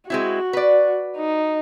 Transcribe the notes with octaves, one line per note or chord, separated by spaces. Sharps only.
G#3 C4 E4 F#4
B4 D5
D#4